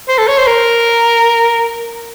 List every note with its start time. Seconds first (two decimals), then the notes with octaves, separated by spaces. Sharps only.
0.08 C5
0.18 A4
0.28 C#5
0.38 C5
0.47 A#4